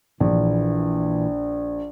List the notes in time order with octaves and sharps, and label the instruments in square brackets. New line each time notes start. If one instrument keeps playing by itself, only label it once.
[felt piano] A#1 [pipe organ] A#2 E3